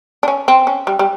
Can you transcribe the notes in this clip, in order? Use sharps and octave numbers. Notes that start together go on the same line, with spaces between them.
D4
C#4
C4
C#4
G3
G3